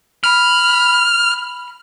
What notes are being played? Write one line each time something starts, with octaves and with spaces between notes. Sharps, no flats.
B5 F6